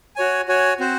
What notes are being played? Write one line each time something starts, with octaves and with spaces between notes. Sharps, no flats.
F#4 C#5 G#5
F#4 C#5 G#5
C4 F#4 C5